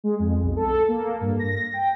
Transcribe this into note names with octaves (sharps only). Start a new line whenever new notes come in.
G#3
F2
B1
A4
A#3
G2
A#6
G5